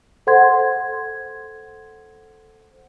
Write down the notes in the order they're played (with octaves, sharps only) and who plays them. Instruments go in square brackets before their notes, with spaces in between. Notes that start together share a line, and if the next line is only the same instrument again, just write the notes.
[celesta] A4 C5 F#5 C6 G#6